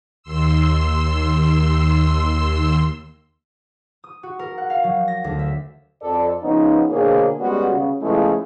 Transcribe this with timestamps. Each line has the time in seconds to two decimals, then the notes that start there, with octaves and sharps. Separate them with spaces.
0.23 D#2 C6 E6
4.04 D#6
4.23 F#4
4.39 A#4
4.58 F#5
4.70 F5
4.84 F#3
5.08 A#6
5.24 D2
5.39 E5
6.02 F2 A4 D5
6.42 C#3 F3 B3 C#4 D#4
6.90 B2 D3 A#3 G#4 C5 C#5
7.40 G3 G#3 B3 C#4 F#4
7.72 C#3
8.01 C#3 F3 G#3 A3 B3 E4